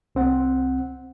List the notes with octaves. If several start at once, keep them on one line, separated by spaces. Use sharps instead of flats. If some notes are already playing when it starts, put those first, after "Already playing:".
C2 C4 F#5